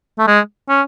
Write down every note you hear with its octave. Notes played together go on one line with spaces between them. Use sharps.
A3
G#3
C#4